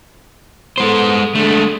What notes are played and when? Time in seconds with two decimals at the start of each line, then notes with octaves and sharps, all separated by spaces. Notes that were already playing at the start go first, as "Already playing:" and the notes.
0.78 G#3 B3 A4 C5
1.35 D3 G#3 A3